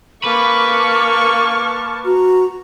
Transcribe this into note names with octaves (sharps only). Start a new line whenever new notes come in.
A#3 B4 A5 B5 C#6 D6 F6
F#4 A#5